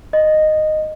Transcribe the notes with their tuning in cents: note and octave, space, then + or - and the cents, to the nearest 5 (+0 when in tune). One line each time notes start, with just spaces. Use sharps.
D#5 -10